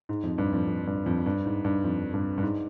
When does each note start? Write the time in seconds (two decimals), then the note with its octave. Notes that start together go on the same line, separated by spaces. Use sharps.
0.09 G#2
0.23 F2
0.38 G2
0.53 F2
0.67 F2
0.87 G2
1.06 F2
1.26 G2
1.45 G#2
1.65 G2
1.84 F2
2.14 G2
2.38 G2
2.43 G#2